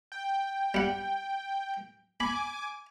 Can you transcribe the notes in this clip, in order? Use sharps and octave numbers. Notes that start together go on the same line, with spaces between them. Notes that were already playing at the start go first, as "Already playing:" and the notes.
G5
G3 F#5
G#5 B5 D6